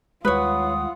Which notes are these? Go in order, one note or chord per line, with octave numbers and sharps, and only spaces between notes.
D#2 G3 G#3 F4 B4 C#5 F#5 D#6